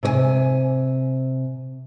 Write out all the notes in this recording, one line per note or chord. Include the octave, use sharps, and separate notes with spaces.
C3 C#5 G#5